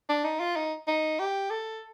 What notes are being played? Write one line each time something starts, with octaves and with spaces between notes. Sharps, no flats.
D4
D#4
F4
D#4
D#4
G4
A4